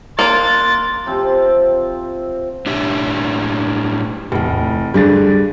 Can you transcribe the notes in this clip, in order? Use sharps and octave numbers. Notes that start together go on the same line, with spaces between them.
A#3 D4 C6 A6
C3 F3 C4
A2 D4 G4 E5
F1 E2 A2
G2 D3 G3 G#4 A6